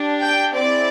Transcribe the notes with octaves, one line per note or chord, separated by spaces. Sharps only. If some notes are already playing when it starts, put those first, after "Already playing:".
Already playing: D4 G4
G5
C4 E4 G#4 D5